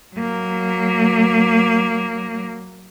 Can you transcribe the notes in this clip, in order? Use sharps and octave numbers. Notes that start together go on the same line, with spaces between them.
F#3 A#3